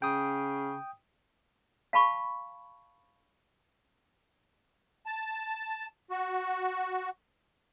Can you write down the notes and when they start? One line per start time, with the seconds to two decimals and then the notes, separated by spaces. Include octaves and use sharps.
0.02 C#3 G5 D#6
1.93 F5 A5 B5 C#6
5.06 A5
6.10 F#4